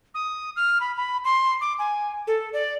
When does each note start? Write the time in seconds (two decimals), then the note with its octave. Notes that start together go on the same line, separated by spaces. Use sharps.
0.15 D#6
0.56 F6
0.81 B5
0.97 B5
1.25 C6
1.61 D6
1.79 G#5
2.27 A4
2.53 D5